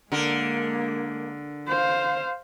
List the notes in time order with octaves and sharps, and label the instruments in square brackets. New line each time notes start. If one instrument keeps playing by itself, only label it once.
[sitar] D3 A#4 [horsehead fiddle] G#3 A#3
[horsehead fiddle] C5 F5